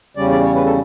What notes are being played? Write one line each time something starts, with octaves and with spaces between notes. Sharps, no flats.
E2 C#3 G3 C#4 D5
D5
C#5
B4
A4